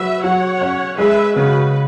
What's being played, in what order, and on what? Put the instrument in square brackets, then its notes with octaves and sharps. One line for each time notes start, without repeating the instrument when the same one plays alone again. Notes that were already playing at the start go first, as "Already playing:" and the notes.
Already playing: [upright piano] F#3 [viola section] B4 E5
[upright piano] F#3 [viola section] C#5 F#5
[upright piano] C#4
[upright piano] G#3 [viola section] B4 E5
[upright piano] C#3 [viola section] F#4 B4